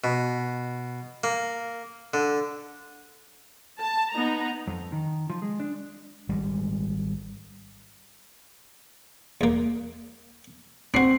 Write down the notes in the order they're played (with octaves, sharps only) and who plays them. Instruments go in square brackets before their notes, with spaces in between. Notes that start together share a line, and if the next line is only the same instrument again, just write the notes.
[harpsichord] B2
A#3
D3
[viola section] A5
B3 D#4 A#5
[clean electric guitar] F2
D#3
F3
G#3
D4
[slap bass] G#1 G3 G#3
[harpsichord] E2 A#3
[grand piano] C4 C7 [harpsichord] D4 F#4